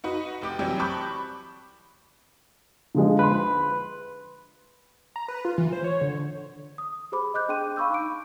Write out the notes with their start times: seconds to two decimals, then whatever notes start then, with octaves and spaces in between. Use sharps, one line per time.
0.04 D#4 F#4 B4
0.42 F1 G4 D6
0.59 C3 E3 F#3 G3 C4 G4
0.80 A5 B5 C#6 D6 F#6 G6
2.95 D3 F3 G#3
3.19 B4 B5 C6
5.16 A#5
5.28 B4
5.45 F4
5.58 E3
5.73 C5
5.84 C#5
6.01 D3
6.78 D#6
7.12 G4 G#4 C5 B5 D6
7.34 D#5 D6 F#6 G6
7.48 D4 G#4 G5 C6 D6 D#7
7.76 F5 B5 C#6 D6 E6 G6
7.90 D#4 D6 D7